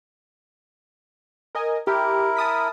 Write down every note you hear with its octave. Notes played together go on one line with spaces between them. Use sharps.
A#4 D#5 G#5
E4 G4 A#4
A5 D#6 B6